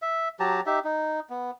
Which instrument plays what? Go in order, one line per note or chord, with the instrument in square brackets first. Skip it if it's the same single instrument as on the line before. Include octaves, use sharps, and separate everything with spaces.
[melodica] E5
F#3 G4 A5 A#5
D#4 G4 E5
D#4
B3